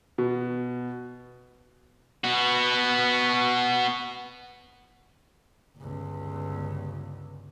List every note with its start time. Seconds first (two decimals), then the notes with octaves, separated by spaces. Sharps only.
0.18 B2
2.24 B3 F#4
5.78 G1 C#2